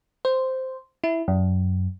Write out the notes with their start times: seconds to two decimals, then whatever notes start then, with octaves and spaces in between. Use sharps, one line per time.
0.25 C5
1.04 E4
1.28 F#2